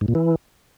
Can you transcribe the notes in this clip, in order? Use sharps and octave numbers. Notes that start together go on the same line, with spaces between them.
G#2
A#2
E3